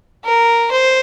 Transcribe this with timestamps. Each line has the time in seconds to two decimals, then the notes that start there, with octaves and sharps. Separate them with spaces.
0.24 A#4
0.72 C5